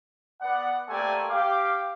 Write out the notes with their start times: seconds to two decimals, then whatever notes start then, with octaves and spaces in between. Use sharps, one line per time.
0.41 B3 D5 F#5
0.89 A3 A#3 C4 G4 D5 G#5
1.29 G4 F5 D6